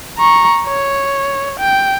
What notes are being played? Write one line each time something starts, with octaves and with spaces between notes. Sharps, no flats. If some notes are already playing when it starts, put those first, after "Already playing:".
A#5 C#6
C#5
G5